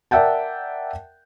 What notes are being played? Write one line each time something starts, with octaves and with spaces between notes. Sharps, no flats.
A#4 D5 E5 F#5 G5 A5